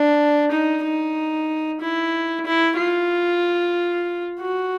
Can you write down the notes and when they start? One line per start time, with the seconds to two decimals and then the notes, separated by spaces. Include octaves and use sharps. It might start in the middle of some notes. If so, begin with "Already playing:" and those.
Already playing: D4
0.52 D#4
0.84 D#4
1.81 E4
2.46 E4
2.78 F4
4.40 F#4